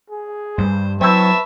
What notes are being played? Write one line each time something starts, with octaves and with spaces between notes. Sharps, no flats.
G#4
G2 G3 C5
F#3 C4 E4 B4 E5 A5 C#6